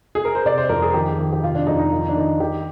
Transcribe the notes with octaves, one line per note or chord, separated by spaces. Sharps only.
G#4
A#4
C5
C3 D5
C5
F2 A#4
G#4
D#3 G4
D#3
G4
C3 F4
D4
F2 D#4
D#4
D#3 F4
D#4
D4
D#3 D#4
D#3 G4